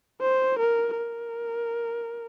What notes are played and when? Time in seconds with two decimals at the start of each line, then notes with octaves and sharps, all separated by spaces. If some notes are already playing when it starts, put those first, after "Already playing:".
0.22 C5
0.59 A#4
0.98 A#4